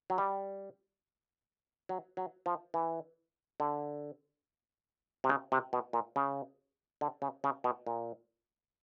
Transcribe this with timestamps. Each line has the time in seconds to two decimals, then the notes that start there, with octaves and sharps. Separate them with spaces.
0.10 F#3
0.18 G3
1.89 F#3
2.17 F#3
2.46 F3
2.74 E3
3.60 D3
5.24 C3
5.29 C#3
5.52 C3
5.73 B2
5.93 A#2
6.16 C#3
7.01 D3
7.22 C#3
7.44 C#3
7.64 B2
7.87 A#2